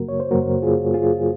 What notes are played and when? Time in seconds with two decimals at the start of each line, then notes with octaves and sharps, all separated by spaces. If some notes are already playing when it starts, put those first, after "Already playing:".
Already playing: F#2 C#3 F#3 A#3 F#4 A#4
0.09 C#5
0.20 C5
0.31 F#2 C#3 F#3 A#3 F#4 A#4
0.62 F4 G#4
0.94 F4 G#4